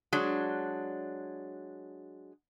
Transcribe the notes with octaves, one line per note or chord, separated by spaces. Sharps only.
F#3 G#3 D4